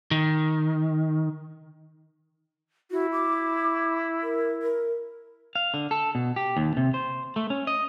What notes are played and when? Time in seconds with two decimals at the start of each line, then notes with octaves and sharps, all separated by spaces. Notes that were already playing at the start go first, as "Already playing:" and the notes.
0.11 D#3
2.91 E4 F#4
3.12 D6
4.23 A#4
4.62 A#4
5.56 F5
5.74 D3
5.91 A4
6.15 B2
6.36 G4
6.57 D#2
6.77 C3
6.94 C5
7.36 A3
7.50 C#4
7.67 D#5